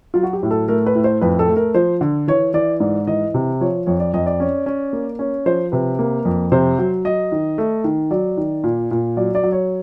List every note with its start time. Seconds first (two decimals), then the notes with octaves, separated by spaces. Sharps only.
0.14 F#3 F4
0.23 F#4
0.33 G4
0.43 A2
0.51 A4
0.68 A3 A#4
0.86 B4
0.95 A2
1.04 C5
1.21 F2 B4
1.39 A4
1.48 A3
1.56 A#4
1.75 F3 C5
2.01 D3
2.28 E3 C#5
2.54 E3 D5
2.80 G#2 D5
3.07 E3 D#5
3.34 C3
3.61 F3 C#5
3.86 F2 C#5
4.00 D5
4.14 F2 D#5
4.26 D5
4.40 C#4
4.66 C#4
4.93 A#3
5.19 C#4
5.46 F3 C5
5.72 C3 B4
5.99 A#3
6.25 F2
6.52 C3 C5
6.78 F#3
7.05 F#3 D#5
7.32 D#3
7.58 A3
7.84 D#3
8.11 F#3 D5
8.37 D#3
8.64 A#2
8.91 A#2
9.17 F#3 D5
9.35 D5
9.43 F#3
9.52 C#5